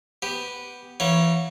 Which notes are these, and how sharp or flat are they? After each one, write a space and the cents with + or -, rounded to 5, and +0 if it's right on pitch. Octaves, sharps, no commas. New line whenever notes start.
B3 +0 G4 +0
E3 +35 A#3 +45 C#5 +0